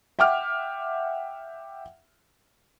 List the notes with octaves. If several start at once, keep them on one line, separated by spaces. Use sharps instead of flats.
E5 F#5 G5 D6 F6